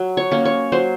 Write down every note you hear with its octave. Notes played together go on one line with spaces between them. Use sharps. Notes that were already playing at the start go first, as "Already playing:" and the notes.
Already playing: F#3
C#5
A#3 C#4
C#5
F#3 C5